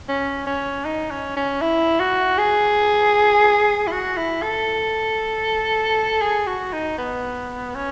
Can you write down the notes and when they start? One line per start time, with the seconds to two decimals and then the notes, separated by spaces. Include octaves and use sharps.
0.09 C#4
0.47 C#4
0.85 D#4
1.11 C#4
1.36 C#4
1.61 E4
2.00 F#4
2.38 G#4
3.87 E4
3.92 F#4
4.17 E4
4.42 A4
6.21 G#4
6.47 F#4
6.73 D#4
6.98 B3
7.75 C#4